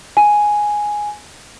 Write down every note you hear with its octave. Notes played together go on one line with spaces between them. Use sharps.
G#5